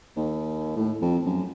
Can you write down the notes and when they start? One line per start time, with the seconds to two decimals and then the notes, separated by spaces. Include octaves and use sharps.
0.17 D#2
0.76 A2
1.02 F2
1.26 F#2